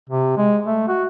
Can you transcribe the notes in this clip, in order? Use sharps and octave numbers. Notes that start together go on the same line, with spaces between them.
C3
G#3
A3
F#4